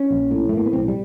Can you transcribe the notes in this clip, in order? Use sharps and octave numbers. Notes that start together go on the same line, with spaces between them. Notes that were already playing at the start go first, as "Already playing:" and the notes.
Already playing: C#4
A#1
A2
A3
A2 A#3
B3
B1 C4
G3